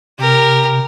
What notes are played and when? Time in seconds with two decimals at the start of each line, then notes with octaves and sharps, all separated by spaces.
0.18 C3 G4 A#4